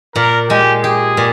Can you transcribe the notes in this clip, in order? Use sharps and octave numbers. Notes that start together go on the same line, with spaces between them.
A#2 A#4
G#3 G4
G4 G#4
A#2